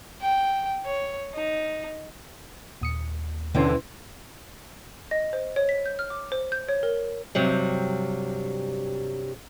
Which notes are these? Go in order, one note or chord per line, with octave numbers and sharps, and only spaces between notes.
G5
C#5
D#4
D#2 A#2 D#6 C#7
B2 D3 E3 C4 C#4 C6
D#5
C5
C#5
B6
G6
F6
D6
C5
G6
C#5
A#4
G2 C3 F#3 G3